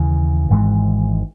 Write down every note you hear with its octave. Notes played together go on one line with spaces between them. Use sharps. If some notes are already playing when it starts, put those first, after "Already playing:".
Already playing: D#2 C#3 E3
G#1 G#2 E3 G#3